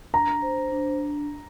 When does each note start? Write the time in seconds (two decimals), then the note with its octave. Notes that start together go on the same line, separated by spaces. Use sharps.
0.13 D4 A#5
0.42 C5
0.72 D4